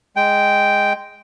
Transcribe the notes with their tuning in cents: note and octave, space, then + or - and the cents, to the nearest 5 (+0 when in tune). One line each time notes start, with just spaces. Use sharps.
G#3 +0 G5 -5